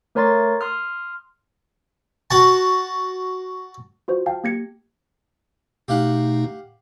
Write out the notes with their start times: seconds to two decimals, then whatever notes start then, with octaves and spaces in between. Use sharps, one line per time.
0.15 A3 A#4 C#5 A#5 C6 A6
0.61 C6 D#6 F6
2.30 F#4 A5
4.08 F4 F#4 C5
4.26 F5 G5 A5
4.44 A#3 G4 G#6 A#6 C#7
5.88 B2 A3 D#4 G4 F5 F#5